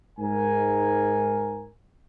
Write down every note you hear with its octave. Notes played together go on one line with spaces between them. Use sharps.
G#2 A#4 G#5